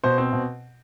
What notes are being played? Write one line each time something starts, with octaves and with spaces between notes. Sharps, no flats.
B2 C5
C4
B2